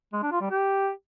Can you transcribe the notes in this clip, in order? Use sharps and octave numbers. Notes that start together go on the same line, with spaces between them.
G#3
D4
F4
G3
G4